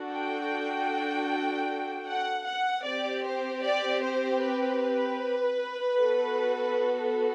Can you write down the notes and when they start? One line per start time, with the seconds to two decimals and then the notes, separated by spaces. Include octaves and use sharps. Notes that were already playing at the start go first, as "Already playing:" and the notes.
Already playing: D4 F#4 A4
0.12 G5
2.07 F#5
2.46 F#5
2.85 C4 G4 D5
3.24 C5
3.63 D5
4.02 C5
4.41 B4
5.97 B3 F#4 A4